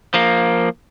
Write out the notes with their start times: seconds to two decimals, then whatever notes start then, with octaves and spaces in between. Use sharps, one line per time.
0.14 F3 A#3